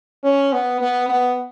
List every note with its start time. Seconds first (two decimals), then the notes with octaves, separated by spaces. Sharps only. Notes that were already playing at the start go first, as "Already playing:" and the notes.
0.23 C#4
0.53 B3
0.81 B3
1.09 B3